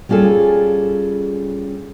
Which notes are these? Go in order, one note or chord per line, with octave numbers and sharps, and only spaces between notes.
G3 C#4 F4 G#4 A4